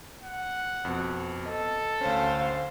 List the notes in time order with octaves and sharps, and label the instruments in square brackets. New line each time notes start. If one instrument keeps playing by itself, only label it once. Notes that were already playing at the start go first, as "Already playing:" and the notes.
[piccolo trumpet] F#5
[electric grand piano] F2 B2
[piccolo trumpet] A4 [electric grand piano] D#5
[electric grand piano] D2 C#4 [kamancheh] C5 F5